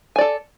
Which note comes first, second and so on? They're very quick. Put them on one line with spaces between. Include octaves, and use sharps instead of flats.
G#5 D5 A4